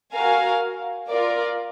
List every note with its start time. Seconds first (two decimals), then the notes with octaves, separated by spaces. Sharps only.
0.13 F#4 A#4 F5 G#5
1.09 F4 A#4 D5